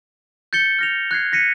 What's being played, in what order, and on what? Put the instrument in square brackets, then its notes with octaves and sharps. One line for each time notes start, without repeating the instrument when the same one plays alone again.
[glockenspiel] G6 A6 C#7 G7
F6 A#6 F7
F#6 G#6 C7
A#6 B6 C#7 D#7